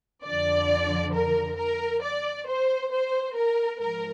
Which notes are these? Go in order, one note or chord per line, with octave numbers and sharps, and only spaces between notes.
F2 D3 F3 D5
A#4
A#4
D5
C5
C5
A#4
G#2 F3 A#4